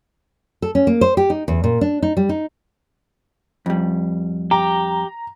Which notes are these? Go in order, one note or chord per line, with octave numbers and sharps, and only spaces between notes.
A4
C#4
A#3
C5
G4
D#4
E2
A#2
D4
D#4
G3
D#4
F2 G3
G4 A#5